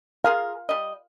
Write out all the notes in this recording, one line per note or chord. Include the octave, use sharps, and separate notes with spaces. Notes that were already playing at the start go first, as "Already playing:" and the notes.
F4 G#4 A#4 F5
G3 D#5